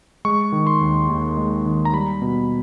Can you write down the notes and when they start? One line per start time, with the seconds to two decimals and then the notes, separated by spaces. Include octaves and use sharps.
0.25 G#3 C#6
0.52 D#3
0.67 C6
0.81 D#2
1.09 D#2
1.37 G#3
1.66 D#3
1.85 A#5
1.93 G3 B5
2.22 B2